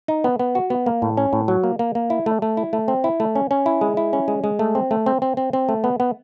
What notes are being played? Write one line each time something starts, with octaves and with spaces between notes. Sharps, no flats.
D#4
B3
B3
F#4
B3
A#3
A2
C#4
A2
F#3
A#3
A#3
A#3
E4
A3
A3
E4
A3
C4
E4
A3
C#4
C#4
E4
G#3
E4
C#4
G#3
G#3
A3
C4
A3
C4
C4
C4
C4
A3
B3
B3